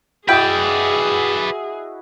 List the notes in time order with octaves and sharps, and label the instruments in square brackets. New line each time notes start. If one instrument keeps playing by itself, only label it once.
[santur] E4 F#4 D#5 [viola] G#4 [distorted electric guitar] B4 D5 [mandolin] G5